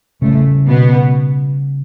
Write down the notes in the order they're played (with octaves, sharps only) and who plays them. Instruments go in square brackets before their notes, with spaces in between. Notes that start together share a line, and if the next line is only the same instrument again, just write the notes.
[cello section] A2 A3 [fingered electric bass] C#3 G3 C#4
[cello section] B2 B3